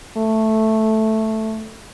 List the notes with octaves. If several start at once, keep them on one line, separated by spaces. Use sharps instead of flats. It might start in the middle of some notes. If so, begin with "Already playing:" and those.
A3